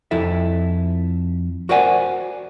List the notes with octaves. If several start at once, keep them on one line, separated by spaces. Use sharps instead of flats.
F2 E4 A4 E5
F#4 A#4 C5 D5 F#5 G#5